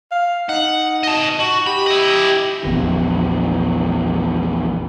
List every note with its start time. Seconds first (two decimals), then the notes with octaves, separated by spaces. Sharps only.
0.12 F5
0.49 D#4 F#5
1.03 D#5 A5
1.40 F#4
1.67 G4 B5
1.87 E4 D#5
2.65 A#1 E2 E3